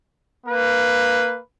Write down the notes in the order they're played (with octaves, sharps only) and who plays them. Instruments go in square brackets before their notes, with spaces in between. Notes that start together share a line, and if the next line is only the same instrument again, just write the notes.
[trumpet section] A#3 B4